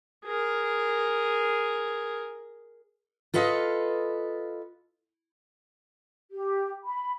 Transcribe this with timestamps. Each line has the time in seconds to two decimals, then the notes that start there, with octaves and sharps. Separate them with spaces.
0.25 G#4 A#4
3.34 F4 A4 B4 D#5 F5
6.31 G4
6.85 B5